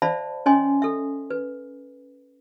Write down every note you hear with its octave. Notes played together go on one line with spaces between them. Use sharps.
C5 D5 E5 F5 A5 B5
C#4 C#5 D#5 G#5 C6
A4 E5
B4